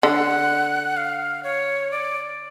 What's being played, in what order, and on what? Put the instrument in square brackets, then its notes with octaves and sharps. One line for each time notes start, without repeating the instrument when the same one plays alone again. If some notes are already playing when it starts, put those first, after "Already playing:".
[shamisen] D3 [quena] F#5
[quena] F5
C#5
D5